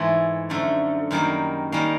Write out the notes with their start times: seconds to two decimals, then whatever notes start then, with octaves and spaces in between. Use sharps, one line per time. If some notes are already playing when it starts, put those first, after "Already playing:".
Already playing: G#2 E3 A3
0.50 F#2 D3 F3 A3
1.11 F#2 D#3 G3 A#3
1.72 D#3 G3 A#3 C#4